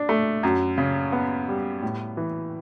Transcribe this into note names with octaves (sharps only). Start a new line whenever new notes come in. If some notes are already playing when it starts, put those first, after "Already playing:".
Already playing: D4
A3
F#2
C#3
B3
G3
A2
E3